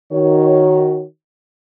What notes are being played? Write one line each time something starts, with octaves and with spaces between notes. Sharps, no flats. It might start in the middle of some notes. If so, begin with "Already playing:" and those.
D#3 F#4 C#5